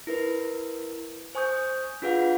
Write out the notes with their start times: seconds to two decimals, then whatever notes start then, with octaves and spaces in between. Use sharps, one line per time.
0.07 E4 A#4 B4
1.35 C5 G#5 C#6 D#6 G6
2.02 D4 F4 G#4 B4 F5 F#5